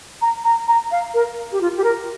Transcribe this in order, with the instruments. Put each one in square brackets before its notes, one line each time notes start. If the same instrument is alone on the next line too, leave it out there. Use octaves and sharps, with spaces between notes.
[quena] A#5
A#5
A#5
F5
A#4
G4
F4
G4
A#4